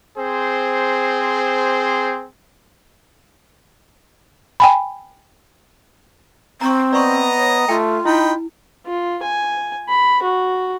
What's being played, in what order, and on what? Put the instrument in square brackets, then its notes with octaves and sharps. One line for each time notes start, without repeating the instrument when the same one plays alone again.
[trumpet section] C4 G#4 C5
[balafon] G5 G#5 B5
[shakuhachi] C4 [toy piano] A#5 C#6
[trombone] B3 [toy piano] D5 B5 C#6 [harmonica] D#5 A#5
[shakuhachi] C#5
[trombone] A3 [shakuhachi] F4 [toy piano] G5 A5
[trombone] D#4 [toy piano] E4 [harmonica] G5 B5
[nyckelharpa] F4
G#5
B5
F#4